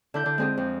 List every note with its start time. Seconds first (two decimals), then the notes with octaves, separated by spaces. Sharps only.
0.14 D3 E4 G6
0.26 D3
0.38 G#3 C4 G#4
0.57 F2